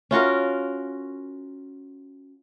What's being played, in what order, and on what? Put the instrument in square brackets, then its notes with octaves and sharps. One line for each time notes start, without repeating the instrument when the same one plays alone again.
[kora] C#4 F4 F#4 A#4